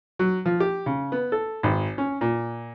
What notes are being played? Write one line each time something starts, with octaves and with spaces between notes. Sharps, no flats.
F#3
F3
G4
C#3
B3
A4
G#1
C#4
A#2